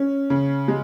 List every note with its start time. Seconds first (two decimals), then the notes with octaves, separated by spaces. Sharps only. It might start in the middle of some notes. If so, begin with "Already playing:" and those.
Already playing: C#4
0.30 C#3
0.68 G#3